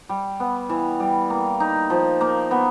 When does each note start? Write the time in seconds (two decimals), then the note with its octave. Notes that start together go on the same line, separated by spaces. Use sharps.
0.09 G3
0.40 B3
0.69 E3
1.00 G3
1.30 A#3
1.60 D#4
1.90 F3
2.21 A#3
2.51 B3